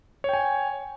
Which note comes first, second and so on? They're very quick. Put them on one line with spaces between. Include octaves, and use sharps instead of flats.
C#5 G5 G#5